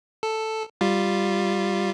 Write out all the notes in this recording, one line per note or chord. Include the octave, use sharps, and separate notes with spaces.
A4
G3 F4